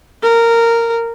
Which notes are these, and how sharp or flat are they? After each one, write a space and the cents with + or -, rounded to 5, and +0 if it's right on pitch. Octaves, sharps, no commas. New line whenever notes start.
A#4 -10